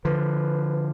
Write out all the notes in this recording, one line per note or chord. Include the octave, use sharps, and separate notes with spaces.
D3 F3 B4